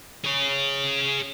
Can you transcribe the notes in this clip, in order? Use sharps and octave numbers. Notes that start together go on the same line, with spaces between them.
G#4 C#5